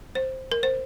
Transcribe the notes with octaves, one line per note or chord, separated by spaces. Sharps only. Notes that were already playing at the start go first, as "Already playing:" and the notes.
C5
A#4
C5